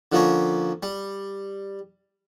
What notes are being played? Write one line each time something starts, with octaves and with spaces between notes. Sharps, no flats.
D3 F3 A#3 C#4
G3